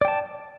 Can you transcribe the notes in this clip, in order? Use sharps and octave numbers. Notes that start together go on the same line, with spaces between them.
D5 G5 A5